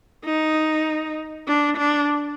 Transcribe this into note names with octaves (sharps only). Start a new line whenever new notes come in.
D#4
D4
D4